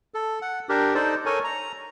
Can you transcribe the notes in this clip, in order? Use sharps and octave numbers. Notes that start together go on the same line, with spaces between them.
A4
F#5
D4 G4 A#4
D#4 A4 C5 D5
A4 A#4 C#5 G#5
A#5